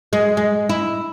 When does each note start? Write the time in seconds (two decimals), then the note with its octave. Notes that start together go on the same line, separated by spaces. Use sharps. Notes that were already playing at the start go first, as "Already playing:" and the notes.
0.13 G#3
0.37 G#3
0.69 E4